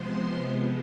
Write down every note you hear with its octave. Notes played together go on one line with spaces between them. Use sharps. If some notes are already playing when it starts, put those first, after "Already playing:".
Already playing: C3 F3 G#3 B3 C5 C6